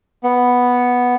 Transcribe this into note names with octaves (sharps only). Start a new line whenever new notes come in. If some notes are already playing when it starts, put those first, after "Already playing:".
B3